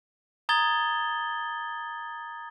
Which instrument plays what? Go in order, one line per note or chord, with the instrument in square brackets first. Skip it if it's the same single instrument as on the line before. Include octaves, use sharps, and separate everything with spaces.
[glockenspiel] A#5 D#6 G#6 A6 G7